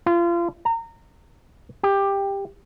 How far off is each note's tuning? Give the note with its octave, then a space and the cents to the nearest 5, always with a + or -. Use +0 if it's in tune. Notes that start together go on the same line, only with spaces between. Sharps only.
F4 -30
A#5 -25
G4 +15